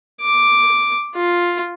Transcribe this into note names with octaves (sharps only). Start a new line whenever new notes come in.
D6
F4